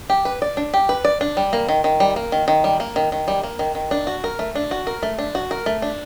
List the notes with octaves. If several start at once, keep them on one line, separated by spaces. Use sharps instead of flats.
G4
B4
D5
D4
G4
B4
D5
D4
G3
A#3
D#3
D#3
G3
A#3
D#3
D#3
G3
A#3
D#3
D#3
G3
A#3
D#3
D#3
D4
F#4
A#4
A3
D4
F#4
A#4
A3
D4
F#4
A#4
A3
D4